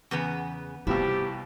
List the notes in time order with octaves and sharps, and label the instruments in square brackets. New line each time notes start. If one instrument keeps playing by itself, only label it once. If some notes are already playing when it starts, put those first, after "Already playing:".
[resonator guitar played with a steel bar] E2 C#3 B3
[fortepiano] C2 B2 F3 [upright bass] B3 [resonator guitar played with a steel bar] E4 [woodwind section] G4